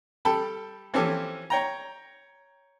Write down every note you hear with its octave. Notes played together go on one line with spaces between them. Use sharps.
G3 A4 G5 A5 B5
E3 F3 C4 C#4 G4 A4
C#5 G5 A#5